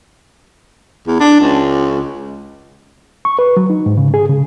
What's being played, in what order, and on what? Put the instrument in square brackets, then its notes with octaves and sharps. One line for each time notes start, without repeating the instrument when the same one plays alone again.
[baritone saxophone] E2
D4
C#2
[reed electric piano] C#6
B4
F#3
D#4
G#2
C#3
G#4
C#3